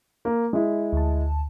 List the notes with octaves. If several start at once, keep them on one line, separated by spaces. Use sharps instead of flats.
A#3
G#3 E4
D2 A5